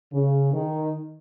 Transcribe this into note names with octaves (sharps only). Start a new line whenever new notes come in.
C#3
D#3